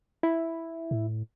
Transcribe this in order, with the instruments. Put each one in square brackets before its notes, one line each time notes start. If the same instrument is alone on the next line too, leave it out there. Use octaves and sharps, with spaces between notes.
[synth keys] E4
[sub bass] A2